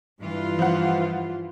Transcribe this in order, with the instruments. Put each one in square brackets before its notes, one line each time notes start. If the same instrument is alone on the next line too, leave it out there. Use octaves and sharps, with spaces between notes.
[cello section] G2 E3 F4
[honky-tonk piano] F3 F#5